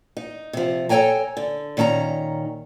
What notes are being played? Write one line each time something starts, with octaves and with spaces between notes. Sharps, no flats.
D#4
C3 F3
A4 C#5 D5 G5 G#5 A#5
D3
A#2 D#3 C#4 A5 A#5